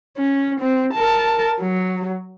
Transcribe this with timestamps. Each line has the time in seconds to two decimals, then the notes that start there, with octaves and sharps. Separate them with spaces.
0.17 C#4
0.61 C4
0.93 A#4 A5
1.61 F#3